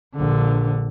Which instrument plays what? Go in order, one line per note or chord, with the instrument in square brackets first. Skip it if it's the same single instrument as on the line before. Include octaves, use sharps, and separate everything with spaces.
[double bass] A#1 D3